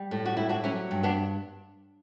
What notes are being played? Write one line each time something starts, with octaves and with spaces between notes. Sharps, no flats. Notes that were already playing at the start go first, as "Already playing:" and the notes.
Already playing: G3
A2
F#4
G3 E4
D4 F#4
F#3 C#4 E4
G2
B3 D4